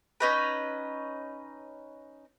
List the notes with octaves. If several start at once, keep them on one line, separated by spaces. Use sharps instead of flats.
C#4 D#4 B4